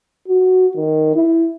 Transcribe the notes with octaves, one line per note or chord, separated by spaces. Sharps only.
F#4
D#3
E4